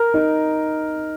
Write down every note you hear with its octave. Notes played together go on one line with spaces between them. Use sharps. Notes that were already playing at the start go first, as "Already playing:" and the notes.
Already playing: A#4
D#4